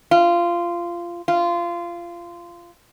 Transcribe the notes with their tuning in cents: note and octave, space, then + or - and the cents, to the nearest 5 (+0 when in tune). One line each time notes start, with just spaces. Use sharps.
F4 -15
F4 -20